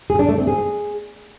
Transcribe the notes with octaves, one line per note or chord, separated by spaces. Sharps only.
G#4
D4
A3
C4
G#4